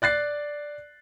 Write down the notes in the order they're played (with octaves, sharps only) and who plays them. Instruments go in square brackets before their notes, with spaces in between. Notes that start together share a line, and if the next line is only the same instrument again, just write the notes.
[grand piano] D5 F#6 A6 C7